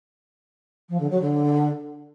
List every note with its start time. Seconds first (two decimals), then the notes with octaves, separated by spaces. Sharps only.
0.89 F3
1.00 D3
1.11 F#3
1.21 D3